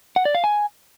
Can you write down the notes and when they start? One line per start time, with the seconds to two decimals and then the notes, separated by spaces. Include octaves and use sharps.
0.16 F#5
0.25 D5
0.35 F5
0.44 G#5